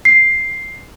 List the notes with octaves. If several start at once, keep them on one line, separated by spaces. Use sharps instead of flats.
C7